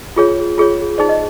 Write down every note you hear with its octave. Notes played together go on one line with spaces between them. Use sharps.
F4 G#4 C#5
F4 G#4 C#5
D#4 G#4 C5 D5
D#5